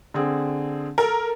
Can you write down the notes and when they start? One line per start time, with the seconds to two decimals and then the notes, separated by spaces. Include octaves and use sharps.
0.14 D3 C4 G#4
0.98 A4 A#4